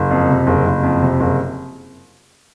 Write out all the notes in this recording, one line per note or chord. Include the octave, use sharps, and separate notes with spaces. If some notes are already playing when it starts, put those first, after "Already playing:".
Already playing: F#1
F2
C3
F#1
F#1
F2
C3
F#1